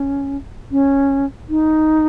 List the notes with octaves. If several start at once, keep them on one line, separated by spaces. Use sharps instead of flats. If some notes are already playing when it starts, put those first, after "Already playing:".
Already playing: C#4
C#4
D#4